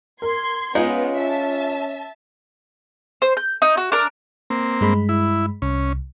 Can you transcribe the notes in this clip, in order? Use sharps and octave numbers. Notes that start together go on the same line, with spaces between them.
A#4 C6 G#6
G#3 B3 C#4 D#4 F4
E5 A5
C5
G6
D#4
F#4
D4 A#4
A#3 C4
G2 G#3 B5
E4
C2 C#4